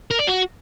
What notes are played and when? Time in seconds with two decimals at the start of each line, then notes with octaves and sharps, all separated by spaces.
0.11 A#4
0.19 D5
0.27 F#4